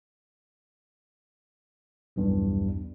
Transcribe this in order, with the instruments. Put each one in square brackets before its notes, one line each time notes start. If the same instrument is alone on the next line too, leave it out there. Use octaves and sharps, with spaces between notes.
[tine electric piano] B1 E2 G2